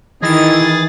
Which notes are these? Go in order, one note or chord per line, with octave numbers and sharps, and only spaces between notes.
D#3 E3 E4 G#4 D#5 A6